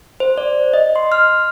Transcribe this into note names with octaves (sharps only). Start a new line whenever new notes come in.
C5
D5
D#5
C6
F6